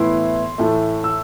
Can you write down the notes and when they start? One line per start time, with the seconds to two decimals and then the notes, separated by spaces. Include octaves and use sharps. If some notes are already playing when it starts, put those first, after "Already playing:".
Already playing: A2 E3 B3 E4 C6
0.58 A2 E3 A3
1.04 E6